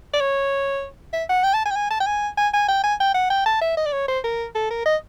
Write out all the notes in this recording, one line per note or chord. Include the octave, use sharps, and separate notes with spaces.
D5
C#5
E5
F#5
G5
A5
G#5
G5
G#5
A5
G5
G#5
G#5
G#5
G5
G#5
G5
F#5
G5
A5
E5
D#5
D5
C#5
C5
A#4
A4
A#4
D#5